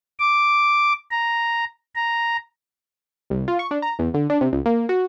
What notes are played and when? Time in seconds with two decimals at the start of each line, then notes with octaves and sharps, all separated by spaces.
0.19 D6
1.11 A#5
1.95 A#5
3.30 C2
3.48 F4
3.59 C#6
3.71 D4
3.82 A#5
3.99 E2
4.14 D3
4.30 D4
4.41 C3
4.53 C#2
4.66 A#3
4.89 F#4